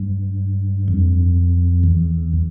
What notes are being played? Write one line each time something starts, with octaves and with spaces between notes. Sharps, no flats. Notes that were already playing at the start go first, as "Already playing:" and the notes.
Already playing: G2
F2
E2